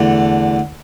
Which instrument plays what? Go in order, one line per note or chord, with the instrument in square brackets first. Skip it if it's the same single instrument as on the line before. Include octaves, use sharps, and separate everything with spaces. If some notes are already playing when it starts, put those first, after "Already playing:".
Already playing: [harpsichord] E2 D3 A3